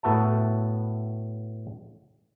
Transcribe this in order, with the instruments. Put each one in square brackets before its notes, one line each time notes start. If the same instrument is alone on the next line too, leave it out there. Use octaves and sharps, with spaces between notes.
[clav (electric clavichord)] A2 B3 F#4 E5 A5